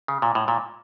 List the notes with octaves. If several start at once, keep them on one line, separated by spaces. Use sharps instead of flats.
C#3
A#2
A2
A#2